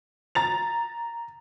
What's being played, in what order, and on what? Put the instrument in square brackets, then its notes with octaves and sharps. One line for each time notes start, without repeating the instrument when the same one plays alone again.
[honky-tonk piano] A#5 A6 F7